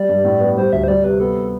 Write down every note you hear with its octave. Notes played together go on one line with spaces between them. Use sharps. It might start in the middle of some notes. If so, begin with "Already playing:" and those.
Already playing: G3 D5
G2
A2
B3
G3 C5
D2 E5
C5
G3 D5
C3 B4
B3 A4